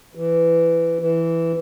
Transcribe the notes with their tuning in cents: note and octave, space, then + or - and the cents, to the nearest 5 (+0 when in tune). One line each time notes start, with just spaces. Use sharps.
E3 +15
E3 +5